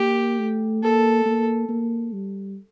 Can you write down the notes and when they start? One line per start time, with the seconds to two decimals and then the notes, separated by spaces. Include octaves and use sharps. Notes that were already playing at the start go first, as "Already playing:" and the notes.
Already playing: A#3 G4
0.39 A3
0.83 A#3 A4
1.26 A#3
1.69 A#3
2.13 G3